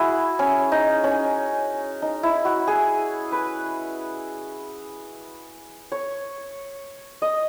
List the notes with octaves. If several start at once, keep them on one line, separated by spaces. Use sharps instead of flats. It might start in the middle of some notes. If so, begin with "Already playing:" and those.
Already playing: E4 F#4 G#4
C#4
D#4
C#4
D#4
E4
F#4
G#4
B4
C#5
D#5